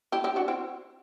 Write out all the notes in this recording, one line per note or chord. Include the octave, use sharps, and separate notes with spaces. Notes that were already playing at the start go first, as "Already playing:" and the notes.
E4 G4
E4 G4
D4 F#4
C4 E4